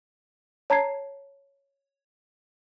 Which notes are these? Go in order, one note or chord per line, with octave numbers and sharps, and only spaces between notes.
C#5 A5 A#5 G#6 C7